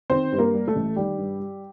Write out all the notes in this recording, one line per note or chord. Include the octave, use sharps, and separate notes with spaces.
D#3 C4 C5
G2
A#3 A#4
G3
A3 A4
A1
D#3 G3 G4
G2
G3